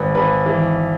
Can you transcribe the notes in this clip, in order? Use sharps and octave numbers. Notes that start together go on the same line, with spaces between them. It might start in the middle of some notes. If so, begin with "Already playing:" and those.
Already playing: G#1 B4
G#1 B4
E3